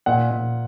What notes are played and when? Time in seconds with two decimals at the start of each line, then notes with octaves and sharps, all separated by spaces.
0.06 A#2 F#5
0.31 A#2